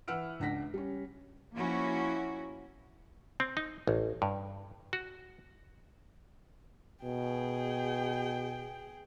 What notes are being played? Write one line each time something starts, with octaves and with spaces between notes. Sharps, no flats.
E3 B4 F#5 E6 F6 D7
C#2 D4 F#5 A#6 B6
G3 C#4
F3 A#3 C#4 E4 F#4
C4
D#4
A1
G2
F#4
B2 G#4 G5